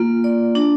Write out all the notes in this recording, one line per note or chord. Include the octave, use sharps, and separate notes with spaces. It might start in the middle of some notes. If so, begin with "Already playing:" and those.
Already playing: A#3 F4
D5
D4